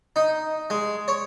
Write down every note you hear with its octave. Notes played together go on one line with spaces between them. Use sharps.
D#4
G#3
C#5